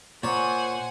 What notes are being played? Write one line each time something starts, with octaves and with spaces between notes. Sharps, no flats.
A#2 C5 C#5 F#5 G#5